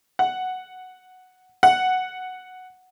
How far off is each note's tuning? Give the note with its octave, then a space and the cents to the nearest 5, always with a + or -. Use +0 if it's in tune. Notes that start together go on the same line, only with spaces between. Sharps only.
F#5 +0
F#5 +0